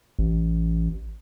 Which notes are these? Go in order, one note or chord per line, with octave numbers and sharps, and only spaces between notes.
A1